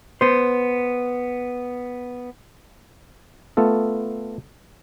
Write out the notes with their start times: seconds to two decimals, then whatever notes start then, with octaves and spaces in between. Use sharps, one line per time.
0.21 B3 C5
3.57 A3 B3 F4 A4